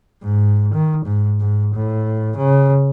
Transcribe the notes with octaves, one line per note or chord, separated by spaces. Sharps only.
G#2
D#3
G#2
G#2
A2
C#3